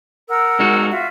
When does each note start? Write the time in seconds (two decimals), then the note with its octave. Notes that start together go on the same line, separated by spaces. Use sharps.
0.30 A#4 F#5 E6
0.59 G#3 D#4 F#4
0.91 F4 F#4 E5